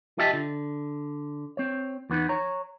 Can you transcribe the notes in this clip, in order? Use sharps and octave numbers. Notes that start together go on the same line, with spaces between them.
F4 G4 D#5 E5 G5 A5
D3
C4 C#5
E2 B3 D#4
C#5 A#5